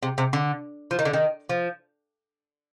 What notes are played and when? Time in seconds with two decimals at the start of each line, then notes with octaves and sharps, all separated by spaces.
0.03 C3
0.18 C3
0.33 D3
0.91 F3
0.99 D#3
1.05 D3
1.13 D#3
1.49 F3